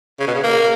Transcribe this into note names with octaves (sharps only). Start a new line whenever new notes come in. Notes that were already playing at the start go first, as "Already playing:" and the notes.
C#3
B2
C#3
A#3